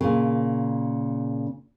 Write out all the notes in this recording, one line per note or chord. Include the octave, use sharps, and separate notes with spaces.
A#2 C#3